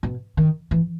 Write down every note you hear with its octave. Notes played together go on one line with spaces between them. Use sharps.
B2
D#3
E3